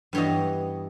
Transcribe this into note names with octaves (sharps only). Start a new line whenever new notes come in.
G2 E3 G3 B3 C#5 D#5